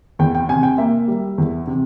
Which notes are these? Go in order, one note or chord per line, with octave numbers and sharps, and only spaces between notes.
E2 G5
G5
C3 G#5
G5
A#3 E5
G3
E2
C3